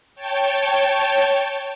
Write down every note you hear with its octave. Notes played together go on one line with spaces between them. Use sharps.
C#5 G5 A5